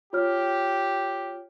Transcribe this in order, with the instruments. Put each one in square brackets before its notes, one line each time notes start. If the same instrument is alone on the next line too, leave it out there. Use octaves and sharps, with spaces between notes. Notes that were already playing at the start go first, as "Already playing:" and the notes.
[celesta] F4 C#5 F6 [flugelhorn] G4